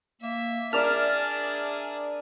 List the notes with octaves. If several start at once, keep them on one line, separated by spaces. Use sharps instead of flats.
A#3 E5
D4 G#4 A#4 D5 E5 A5 F6